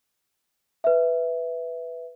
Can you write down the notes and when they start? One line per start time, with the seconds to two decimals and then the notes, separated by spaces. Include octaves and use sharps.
0.84 B4 E5